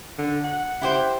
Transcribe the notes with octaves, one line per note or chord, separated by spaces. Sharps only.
D3
F#5
E4 G4 C5